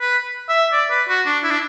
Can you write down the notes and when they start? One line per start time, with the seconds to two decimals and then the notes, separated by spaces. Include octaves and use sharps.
0.01 B4
0.49 E5
0.73 D5
0.91 B4
1.08 F#4
1.26 D4
1.44 E4
1.51 D4